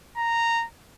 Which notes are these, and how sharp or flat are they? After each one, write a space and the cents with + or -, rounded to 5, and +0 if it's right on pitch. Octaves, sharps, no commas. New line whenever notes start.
A#5 -10